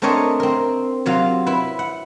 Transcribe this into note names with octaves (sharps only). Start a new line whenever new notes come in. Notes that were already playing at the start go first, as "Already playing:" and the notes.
A3 C4 D4 A#4 C#5 D#5
C4 A#4
C3 F#3 F4 F5
E4 B4
F#5